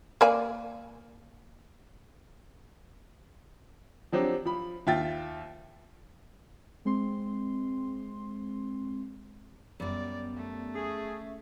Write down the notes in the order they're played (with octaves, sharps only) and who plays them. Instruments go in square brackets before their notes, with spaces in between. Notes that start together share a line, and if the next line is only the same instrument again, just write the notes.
[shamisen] A#3 D5 G#5
[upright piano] F3 F#3 C4 D4 G4
F3 B5
D#2 F4 E5 G5 A6
[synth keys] G#3 C4 C6
[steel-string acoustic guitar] F#2 G3 [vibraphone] B3 [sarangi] D5
[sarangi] A3
[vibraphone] C#4 E5 [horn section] G#4